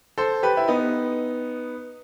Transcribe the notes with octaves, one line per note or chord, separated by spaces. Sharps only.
A4 C5
G4 B4
E4
B3 D#4